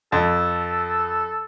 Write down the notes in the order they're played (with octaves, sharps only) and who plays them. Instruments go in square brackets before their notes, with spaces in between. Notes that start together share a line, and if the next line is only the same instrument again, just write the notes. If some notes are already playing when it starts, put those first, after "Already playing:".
[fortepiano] F2 [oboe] A4